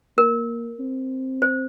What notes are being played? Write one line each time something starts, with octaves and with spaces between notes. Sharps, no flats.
A#3 A#4
C4
C5